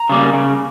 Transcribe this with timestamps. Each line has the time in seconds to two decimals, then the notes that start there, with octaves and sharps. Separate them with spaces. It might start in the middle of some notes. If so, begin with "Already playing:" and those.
Already playing: A#5
0.09 C#3 G3 A#3
0.33 C#3